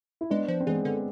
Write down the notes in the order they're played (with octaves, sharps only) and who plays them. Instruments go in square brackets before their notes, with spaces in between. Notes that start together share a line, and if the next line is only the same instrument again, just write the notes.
[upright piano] E4
[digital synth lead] G#3 [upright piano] B3 D4
[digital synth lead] F3
[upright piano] C4
[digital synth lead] E3 [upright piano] G#3 B3
[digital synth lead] D3